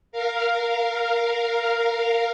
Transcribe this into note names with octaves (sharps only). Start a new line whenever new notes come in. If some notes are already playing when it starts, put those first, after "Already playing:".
A#4 F5